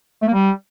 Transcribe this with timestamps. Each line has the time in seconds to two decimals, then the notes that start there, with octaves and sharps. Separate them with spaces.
0.22 A3
0.28 A#3
0.33 G3